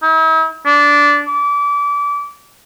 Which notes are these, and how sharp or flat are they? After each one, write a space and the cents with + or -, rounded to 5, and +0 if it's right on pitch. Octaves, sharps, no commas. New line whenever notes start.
E4 -45
D4 -15
D6 -30